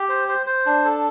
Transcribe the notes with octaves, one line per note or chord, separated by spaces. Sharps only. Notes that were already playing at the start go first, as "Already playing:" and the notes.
Already playing: G4
C5
C5
C5
D4
A4